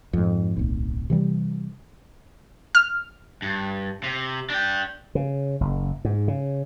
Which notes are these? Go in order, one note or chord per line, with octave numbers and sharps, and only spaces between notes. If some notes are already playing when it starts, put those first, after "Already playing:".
F2 G#2
D1 B1
C3 E3 F#3 G3
F6
G2
C3
D4 G5
C#3
F#1
G#2
C#3